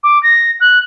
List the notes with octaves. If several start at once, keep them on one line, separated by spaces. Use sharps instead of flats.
D6
A#6
F#6